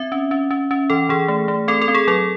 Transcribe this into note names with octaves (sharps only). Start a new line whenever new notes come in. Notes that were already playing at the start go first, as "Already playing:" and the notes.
Already playing: C4 E5
C#4
C#4
C#4
C#4
E3 A4
E3 G#4
A3
A3
C4 A4
A4
C4
G#4
F#3 A4